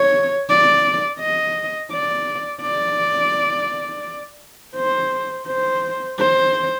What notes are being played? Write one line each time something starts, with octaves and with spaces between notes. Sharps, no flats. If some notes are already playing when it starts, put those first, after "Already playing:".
Already playing: C#5
D5
D#5
D5
D5
C5
C5
C5